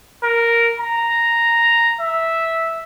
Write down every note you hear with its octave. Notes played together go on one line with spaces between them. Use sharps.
A#4
A#5
E5